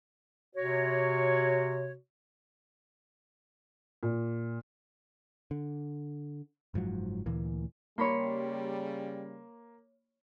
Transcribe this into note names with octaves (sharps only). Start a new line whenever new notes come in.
C3 F#4 C#5
A#2
D3
F#1 G#2 F3 F#3
D2 A#2 E3 A#3
C#3 G3 A#3 C#5 B5 C6